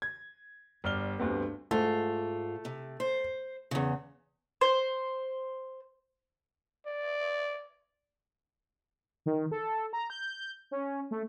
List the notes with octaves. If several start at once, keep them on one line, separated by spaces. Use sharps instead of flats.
G#6
G1 D5 F6 G7
D2 G2 D3 B3 C4
G#2 A3 F4
C3
C5
E2 C#3
C5
D5
D#3
A4
A#5
G6
C#4
A3